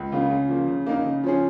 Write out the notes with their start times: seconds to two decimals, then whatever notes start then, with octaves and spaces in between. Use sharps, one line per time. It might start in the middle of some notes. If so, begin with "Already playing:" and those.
Already playing: C#2
0.12 C#3 A#3 F4
0.30 C#3
0.48 F3 A#3
0.68 C#3
0.86 A#3 D#4 A#4
1.05 C#3
1.24 F3 C#4 G#4